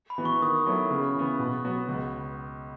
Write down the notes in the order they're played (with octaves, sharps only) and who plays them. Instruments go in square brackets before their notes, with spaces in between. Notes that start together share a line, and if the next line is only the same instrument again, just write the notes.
[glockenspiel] B5
[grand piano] E3 B3 F#4
[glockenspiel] C#6
[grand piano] D#3 [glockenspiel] D#6
[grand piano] F#3 B3 E4 A4
C#3
E3 B3
B2
F#3 B3 F#4
C#2